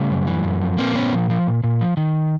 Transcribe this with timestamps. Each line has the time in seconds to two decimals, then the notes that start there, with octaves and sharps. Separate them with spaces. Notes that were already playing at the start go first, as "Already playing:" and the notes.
Already playing: C#3 G3 A3
0.10 F#2
0.27 E3
0.44 F#2
0.62 F3
0.78 A#2 A#3 C4
0.95 A#2 B3 C#4
1.12 F3
1.30 F3
1.47 A#2
1.64 A#2
1.81 F3
1.97 D#3